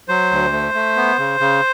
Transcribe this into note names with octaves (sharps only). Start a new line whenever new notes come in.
F#3 C5
D2
A3
A3
B3
C#3
C#3